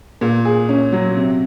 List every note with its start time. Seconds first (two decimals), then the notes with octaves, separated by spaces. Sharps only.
0.21 A#2
0.45 G#4
0.69 C#4
0.92 F#3
1.16 C3